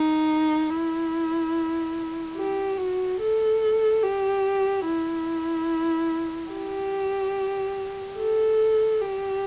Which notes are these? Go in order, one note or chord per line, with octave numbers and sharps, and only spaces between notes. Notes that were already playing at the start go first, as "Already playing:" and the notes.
Already playing: D#4
E4
G4
F#4
A4
G4
E4
G4
A4
G4